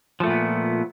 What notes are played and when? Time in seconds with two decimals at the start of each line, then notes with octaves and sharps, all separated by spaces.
0.20 F3
0.24 A3
0.27 A#2
0.30 B3